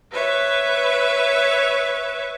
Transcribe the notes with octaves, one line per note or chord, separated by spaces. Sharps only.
B4 C#5 E5